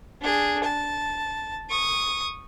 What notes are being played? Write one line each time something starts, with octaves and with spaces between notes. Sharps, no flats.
D4 G#4
A5
C#6 D#6